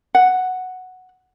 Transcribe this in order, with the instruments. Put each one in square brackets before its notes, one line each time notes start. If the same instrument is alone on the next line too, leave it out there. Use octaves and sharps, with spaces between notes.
[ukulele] F#5